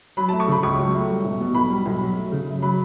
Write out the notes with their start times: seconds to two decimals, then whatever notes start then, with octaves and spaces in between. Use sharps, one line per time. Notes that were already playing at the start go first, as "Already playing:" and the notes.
0.17 F#3 B5
0.29 A3 A5
0.40 C#6
0.48 C#3 B5
0.63 C#2 C#6
0.79 F#3
0.93 A3
1.10 G3
1.24 B1
1.40 B2
1.55 B1 B5
1.70 G3
1.86 B1
2.01 F#3
2.17 A3
2.32 C#3
2.48 F#2
2.62 F#3 B5